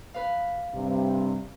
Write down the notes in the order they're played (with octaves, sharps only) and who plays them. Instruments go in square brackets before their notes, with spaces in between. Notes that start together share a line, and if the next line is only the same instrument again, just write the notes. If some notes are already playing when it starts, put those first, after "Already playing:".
[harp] B4 F5
[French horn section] G2 C3